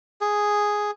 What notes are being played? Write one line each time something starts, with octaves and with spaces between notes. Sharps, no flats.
G#4